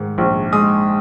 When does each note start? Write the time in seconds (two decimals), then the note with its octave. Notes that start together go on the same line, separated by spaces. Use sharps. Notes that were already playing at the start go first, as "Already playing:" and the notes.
Already playing: G#2 D#3
0.18 A#1
0.53 G#3 D#6